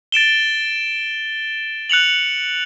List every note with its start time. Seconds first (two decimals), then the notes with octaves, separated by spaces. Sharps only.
0.12 A6 D7 E7 G7
1.90 F#6 C#7 F7 F#7